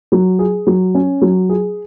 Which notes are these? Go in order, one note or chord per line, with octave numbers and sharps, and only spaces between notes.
F#3
G#4
F#3
C#4
F#3
G#4